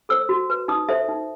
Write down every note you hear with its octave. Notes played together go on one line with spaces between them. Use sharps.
A4 C5 E6
F#4
B4
D#4 D#6
A4 C5 E5
D#4